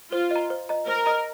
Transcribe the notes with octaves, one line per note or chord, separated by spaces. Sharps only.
F4 C5
D#5 A#5
C5
D#5 A#5
A#4 C5
D#5 A#5 D#6